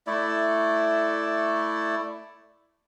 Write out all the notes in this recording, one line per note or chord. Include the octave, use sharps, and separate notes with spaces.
A3 E4 D5